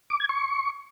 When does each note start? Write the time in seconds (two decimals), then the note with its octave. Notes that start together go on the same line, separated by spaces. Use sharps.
0.10 D6
0.20 G#6
0.29 C#6